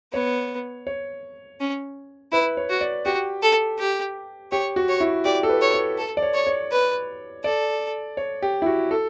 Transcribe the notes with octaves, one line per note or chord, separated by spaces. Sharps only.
B3 C#5
C#5
C#4
E4 B4
C#5
F#4
D5
F#4 G4
A4
G4
G4 C#5
F#4
C#5
E4
G4 D5
A4
B4
C#5
C#5
A4
D5
C#5
C#5
C#5
B4
A4 D5
C#5
G4
E4
F#4
A4